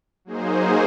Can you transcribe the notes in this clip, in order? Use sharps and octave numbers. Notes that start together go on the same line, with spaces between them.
F#3 A#3 D#4 G#4 C5